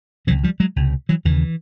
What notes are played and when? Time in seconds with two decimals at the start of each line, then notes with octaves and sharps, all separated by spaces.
0.27 C#2 C3 E3 F#3
0.44 F3 G3
0.60 F#3 G#3
0.76 C#2 C3
1.09 E3 F#3
1.25 D#2 D3 E3
1.29 C#3